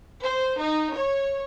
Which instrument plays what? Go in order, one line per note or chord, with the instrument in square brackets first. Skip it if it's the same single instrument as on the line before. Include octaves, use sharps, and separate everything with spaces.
[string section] C5
D#4
C#5